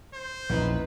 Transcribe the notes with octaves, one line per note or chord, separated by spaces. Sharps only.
C5
A#1 E2 C#4 D#4 B4